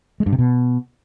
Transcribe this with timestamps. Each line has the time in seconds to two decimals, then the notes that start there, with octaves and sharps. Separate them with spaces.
0.20 G#3
0.26 G2
0.32 C3
0.39 B2